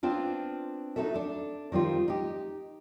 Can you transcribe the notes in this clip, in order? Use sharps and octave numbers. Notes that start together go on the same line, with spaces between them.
B3 C4 D4 F4
D#4 E4 F#4 A4 E5
D4 A4
D#3 G3 C4 F4
D#4 G4